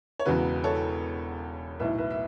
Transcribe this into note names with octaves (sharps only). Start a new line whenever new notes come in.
C#5
E1 E2 C#3 E3 F#4 B4
A4 C#5
B1 A2 E3 B4 E5
B4 E5
E5